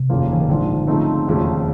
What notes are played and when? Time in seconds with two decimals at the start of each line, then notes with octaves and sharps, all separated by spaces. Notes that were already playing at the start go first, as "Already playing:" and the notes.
Already playing: C3
0.09 F1 D#2 C#3 F3 A#3
0.32 E3
0.40 D#3
0.49 A#1 G#2 D3 F3
0.87 C#3 F3 A3 C4 D#4
1.27 E1 D#2 C#3 F3 A3